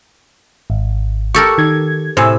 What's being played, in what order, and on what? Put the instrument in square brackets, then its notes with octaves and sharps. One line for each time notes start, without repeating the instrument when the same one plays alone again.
[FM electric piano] G#1
[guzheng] G4 A4 A#4 [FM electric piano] C#6
[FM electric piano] D#3 G#6
[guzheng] A2 C3 [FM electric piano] C5 G#5 E6